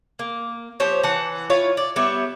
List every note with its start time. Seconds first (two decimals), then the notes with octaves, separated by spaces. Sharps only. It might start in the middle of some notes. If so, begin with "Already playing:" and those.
0.19 A#3
0.80 F3 G4 C5 C#5
1.03 E3 F#5 A5
1.50 E4 F4 C#5 F5
1.77 D5
1.96 G3 B3 C#5 E5